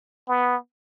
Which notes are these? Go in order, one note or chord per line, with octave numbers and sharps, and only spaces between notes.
B3